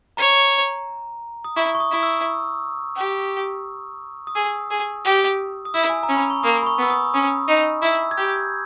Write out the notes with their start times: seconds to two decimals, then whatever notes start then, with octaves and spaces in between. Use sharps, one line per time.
0.17 C#5 A#5
1.44 D#6
1.56 E4 C#6
1.75 C#6
1.80 D#6
1.91 E4
2.03 E6
2.96 G4
4.27 D#6
4.35 G#4 E6
4.70 G#4
5.05 G4
5.65 D#6
5.74 E4 E6
5.90 G#5
6.03 A#5
6.09 C#4
6.16 B5
6.30 C#6
6.43 A#3 D#6
6.62 B5
6.66 C#6
6.78 B3 E6
6.90 D#6
7.14 C#4 D#6
7.48 D#4
7.82 E4 E6
8.11 G#6
8.17 G4 G6